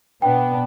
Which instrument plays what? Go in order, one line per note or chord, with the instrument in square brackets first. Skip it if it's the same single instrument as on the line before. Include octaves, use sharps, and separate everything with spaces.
[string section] B2 B3 D4 [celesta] G5